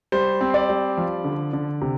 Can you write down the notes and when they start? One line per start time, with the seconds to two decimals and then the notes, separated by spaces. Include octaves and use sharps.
0.12 G3 C5
0.41 C4
0.54 D5
0.69 G3
0.97 F3
1.24 D3
1.53 D3
1.81 C3